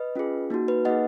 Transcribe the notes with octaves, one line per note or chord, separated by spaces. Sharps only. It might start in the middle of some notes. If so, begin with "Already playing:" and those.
Already playing: B4 D#5
C#4 F4 G#4
A#3 D#4 F#4
B4
A#3 D#4 G#4 D#5 F#5